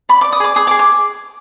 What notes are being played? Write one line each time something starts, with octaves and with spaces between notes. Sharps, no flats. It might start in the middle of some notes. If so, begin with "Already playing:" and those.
D5 B5
D5 D6
D#6
G#4 D6
G#4 D#6
D6
G#4
D6